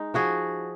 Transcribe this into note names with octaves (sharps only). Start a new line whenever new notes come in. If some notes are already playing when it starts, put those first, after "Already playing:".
Already playing: G#3 D#4
F3 F#4 G#4